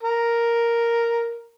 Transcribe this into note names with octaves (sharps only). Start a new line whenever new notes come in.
A#4